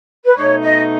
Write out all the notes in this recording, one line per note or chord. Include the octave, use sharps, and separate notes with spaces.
B4
B2 A3 D#4 C#5
D#5